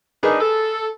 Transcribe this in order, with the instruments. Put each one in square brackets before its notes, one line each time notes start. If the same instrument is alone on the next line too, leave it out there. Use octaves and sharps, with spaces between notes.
[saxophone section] D4 D#4 [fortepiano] G#4 A#4 B4
[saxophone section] A4